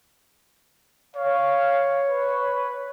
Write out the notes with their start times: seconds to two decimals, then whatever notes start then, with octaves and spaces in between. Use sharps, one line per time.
1.16 C#5 F5
2.09 B4